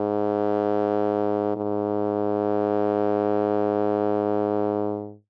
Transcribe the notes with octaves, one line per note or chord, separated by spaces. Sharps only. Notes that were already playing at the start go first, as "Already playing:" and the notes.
Already playing: G#2
G#2